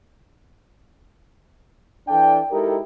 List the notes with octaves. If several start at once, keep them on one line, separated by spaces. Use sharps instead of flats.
E3 D4 A4 D5 G5
G#3 D#4 E4 G4 A4 A#4